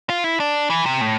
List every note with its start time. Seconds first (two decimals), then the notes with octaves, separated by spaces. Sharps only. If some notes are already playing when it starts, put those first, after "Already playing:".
0.09 F4
0.24 E4
0.40 D4
0.70 E3
0.86 C3
1.01 A2